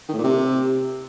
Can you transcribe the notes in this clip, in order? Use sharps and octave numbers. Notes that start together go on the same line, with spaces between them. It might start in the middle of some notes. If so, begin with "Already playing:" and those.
D#3
A2
A#2
C3